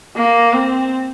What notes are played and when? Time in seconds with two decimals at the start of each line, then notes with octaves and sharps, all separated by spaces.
0.16 A#3
0.53 C4